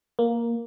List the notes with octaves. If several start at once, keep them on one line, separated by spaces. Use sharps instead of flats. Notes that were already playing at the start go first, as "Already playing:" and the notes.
A#3